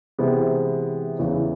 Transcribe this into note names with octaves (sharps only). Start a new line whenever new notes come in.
C3 E3 G#3 B3
E2 C#3 E3